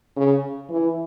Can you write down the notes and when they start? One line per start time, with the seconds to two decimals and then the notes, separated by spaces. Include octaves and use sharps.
0.16 C#3
0.70 E3